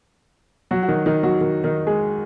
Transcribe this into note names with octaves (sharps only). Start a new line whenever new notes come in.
F#3 F#4
F#4
D#3 D#4
D#3 D#4
F#3 F#4
D#3
D#3 D#4
G#3 G#4